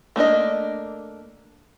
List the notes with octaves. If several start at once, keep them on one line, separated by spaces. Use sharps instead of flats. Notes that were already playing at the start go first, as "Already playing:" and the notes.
A3 A#3 D4 D#5